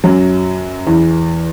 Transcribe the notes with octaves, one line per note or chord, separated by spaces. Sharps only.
F#2 F#3
E2 E3